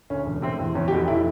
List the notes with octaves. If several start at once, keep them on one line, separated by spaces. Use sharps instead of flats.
D2 C#4
E1
C3 C4
E2 C4
E2 C#4
G4
F1 F#4
A2 E4